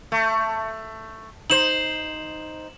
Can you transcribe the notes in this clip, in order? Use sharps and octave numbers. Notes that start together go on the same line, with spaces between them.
A3
D#4 C5 E7 F#7